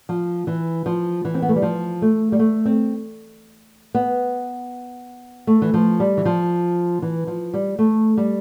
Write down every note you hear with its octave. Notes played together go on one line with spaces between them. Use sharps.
F3
E3
F3
E3
C4
B3
A3
G3
F3
A3
G3
A3
C4
B3
A3
E3
F3
G3
E3
F3
E3
F3
G3
A3
G3